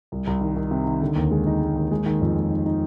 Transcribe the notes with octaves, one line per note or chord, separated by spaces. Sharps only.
C2
C2
D#3
D#3
C3
D#3
D3
D#2
G#3
D#4
G#3
D#2
G#3
D#3
F2
G#3
D#4
D#4